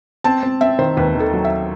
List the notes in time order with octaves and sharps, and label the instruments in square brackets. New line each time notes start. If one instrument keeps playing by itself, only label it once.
[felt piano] C4 A5
C4
C4 E5
D#3 C5
D#2 B4
D#3
A4
F#3
E5